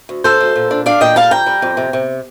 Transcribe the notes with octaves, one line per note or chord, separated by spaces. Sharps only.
D2
D2 A4 C5
D2
A#2
D4
D4 D5 F5
A#2 D#5 G5
G3 F5 A5
F2 G5 A#5
G3
F2
C3
C3